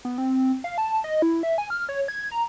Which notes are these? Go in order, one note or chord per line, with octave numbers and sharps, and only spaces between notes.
B3
C4
F5
A5
D#5
E4
E5
G#5
F6
C#5
G#6
A#5